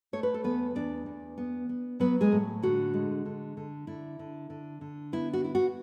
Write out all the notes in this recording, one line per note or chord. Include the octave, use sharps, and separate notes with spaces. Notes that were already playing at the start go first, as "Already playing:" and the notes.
A3 C#5
B4
A4
E2 B3 B4
E2 D4 D5
E2
B3
B3
F#3 B3 B4
G#3 G#4
A2
D3 F#4
G#3
D3
D3
D3 E4
D3
D3
D3
B3 E4
F#4
E4
F#4